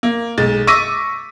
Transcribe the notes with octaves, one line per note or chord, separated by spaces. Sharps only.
A#3
B1 G#3 A6
C#6 D6 E6 A#6 B6 D#7